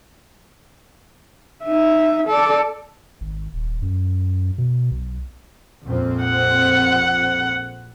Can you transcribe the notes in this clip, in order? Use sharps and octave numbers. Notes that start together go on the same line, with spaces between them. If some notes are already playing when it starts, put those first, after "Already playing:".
D#4 E5
A4 D5
G#1
D#1
F#2
B2
B1
A#1 F2 C4
F#5